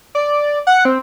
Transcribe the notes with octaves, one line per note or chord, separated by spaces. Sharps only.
D5
F#5
C4